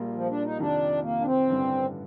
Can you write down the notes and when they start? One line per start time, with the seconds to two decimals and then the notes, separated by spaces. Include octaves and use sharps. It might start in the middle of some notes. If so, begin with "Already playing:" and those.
Already playing: A#1 A#2 G3 A#3 F4
0.14 F3
0.30 D4
0.44 D#4
0.59 F2 C3 D#3 D4
1.03 A#3
1.21 D4
1.26 C4
1.48 A1 G2 D3